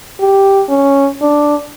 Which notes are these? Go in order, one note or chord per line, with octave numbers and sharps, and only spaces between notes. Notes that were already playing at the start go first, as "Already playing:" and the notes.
G4
C#4
D4